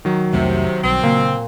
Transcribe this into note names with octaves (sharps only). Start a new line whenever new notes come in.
D#3 F#3
C2 F2 C3 A3
B1 G3 C4
A#2 C#3